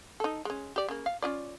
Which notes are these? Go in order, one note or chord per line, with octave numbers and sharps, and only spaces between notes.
D#4 A4
G#3 C#4
G4 D5
C#3 A#3
F5
C#4 F4 D5